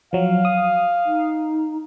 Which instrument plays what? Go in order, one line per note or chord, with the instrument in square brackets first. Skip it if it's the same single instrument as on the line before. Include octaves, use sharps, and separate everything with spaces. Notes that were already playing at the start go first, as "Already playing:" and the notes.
[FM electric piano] F3 F#3 [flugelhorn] F5
[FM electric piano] D#6
[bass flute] D#4